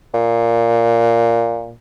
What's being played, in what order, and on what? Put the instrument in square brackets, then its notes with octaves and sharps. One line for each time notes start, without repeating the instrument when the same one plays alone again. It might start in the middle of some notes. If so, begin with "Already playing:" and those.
[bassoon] A#2